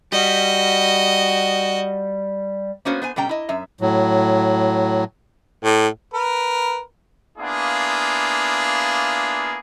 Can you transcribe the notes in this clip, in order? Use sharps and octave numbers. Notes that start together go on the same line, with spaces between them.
G3 F#4 D#5
A#3 B3 C#4 F#4 C5
B3 C5 G#5
B2 G3 C#4 G5 A#5
E4 D#5
F#2 E5
A2 F#3
A2
A#4 B4
A#3 B3 D4 E4 F4 G#4